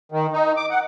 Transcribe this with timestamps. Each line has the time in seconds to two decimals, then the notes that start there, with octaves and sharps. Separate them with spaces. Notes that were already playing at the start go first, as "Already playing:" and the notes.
0.12 D#3
0.33 D#4
0.57 D6
0.70 F#5